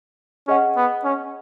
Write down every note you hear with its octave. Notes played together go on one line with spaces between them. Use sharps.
C#4 G#4 D#5 F#5
B3
C#4